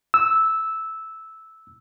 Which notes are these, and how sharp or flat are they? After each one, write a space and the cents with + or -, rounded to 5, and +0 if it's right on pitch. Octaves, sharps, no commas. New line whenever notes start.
E6 -10